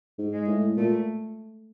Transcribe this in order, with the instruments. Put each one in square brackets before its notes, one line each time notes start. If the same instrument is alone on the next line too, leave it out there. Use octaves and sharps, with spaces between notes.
[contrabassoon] G#2
[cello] G#3
[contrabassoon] A2
[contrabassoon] A#2 [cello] A3